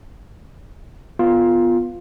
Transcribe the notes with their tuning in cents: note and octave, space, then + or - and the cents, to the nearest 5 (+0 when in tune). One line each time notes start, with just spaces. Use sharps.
B3 +0 F4 +0 C6 +10